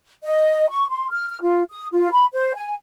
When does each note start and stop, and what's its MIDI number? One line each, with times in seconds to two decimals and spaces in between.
0.23 0.69 75
0.70 0.88 85
0.89 1.07 84
1.11 1.27 89
1.29 1.41 89
1.42 1.63 65
1.70 1.86 87
1.92 2.10 65
2.12 2.26 83
2.32 2.52 72
2.55 2.74 80